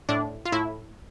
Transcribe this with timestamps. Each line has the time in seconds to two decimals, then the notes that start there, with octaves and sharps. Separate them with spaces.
0.09 A2 D4
0.45 F4
0.52 A2 E4